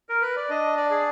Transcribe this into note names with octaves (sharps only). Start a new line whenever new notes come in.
A#4
B4
D5
D4 D#5
D5
G#4